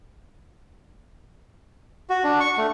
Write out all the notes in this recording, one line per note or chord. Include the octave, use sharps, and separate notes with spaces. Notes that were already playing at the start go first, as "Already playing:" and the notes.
F#4
D4
C#6
A3